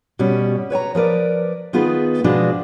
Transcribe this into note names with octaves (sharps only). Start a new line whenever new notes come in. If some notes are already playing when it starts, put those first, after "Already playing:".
B2 G3 C#4
B4 C#5 G#5 A#5
F3 A#4 B4 D5
D#3 B3 F4 G#4 B4
B2 F3 G#3 B3 D4 F#4